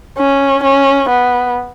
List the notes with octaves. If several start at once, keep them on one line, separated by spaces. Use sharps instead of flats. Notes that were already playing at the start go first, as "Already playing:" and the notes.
C#4
C#4
B3